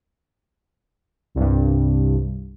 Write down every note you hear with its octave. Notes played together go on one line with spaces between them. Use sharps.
C2 G2